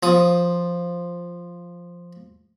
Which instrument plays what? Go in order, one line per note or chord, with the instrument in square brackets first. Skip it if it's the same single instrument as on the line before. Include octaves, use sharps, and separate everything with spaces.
[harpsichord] F3 D#6